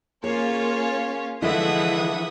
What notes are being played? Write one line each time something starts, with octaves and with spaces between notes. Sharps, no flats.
A#3 C#4 F4 G#4 C#5
D3 E3 F3 G#3 E4 E5 F#5 D#6